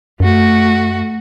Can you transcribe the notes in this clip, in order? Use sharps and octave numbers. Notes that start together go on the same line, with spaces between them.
F#2 A3 F#4